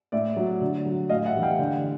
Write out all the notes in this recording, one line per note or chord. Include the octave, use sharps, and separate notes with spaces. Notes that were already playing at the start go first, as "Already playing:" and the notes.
A2 D5 E5
F#3
D3
F#3
A2 D#5 F5
E5 F#5
E3 G3
F5 G5
D3